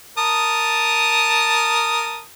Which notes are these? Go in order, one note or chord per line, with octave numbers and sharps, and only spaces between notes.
A#4 A5 D#6